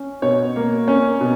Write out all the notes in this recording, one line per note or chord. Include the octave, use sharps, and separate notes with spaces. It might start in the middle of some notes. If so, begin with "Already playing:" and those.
Already playing: C#4
B2 C#5
A#3
C#4
B2